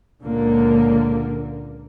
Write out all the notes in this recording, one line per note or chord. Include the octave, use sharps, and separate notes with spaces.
C#2 A#2 D3 A#3